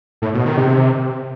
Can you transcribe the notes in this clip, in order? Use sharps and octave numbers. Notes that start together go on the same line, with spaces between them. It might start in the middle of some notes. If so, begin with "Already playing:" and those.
A2
B2
D#3
C3